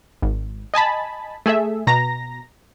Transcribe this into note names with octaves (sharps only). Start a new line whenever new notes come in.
G#1
D#5 G#5 A5 B5
A3 G#4 A4 E5
B2 A#5 A#6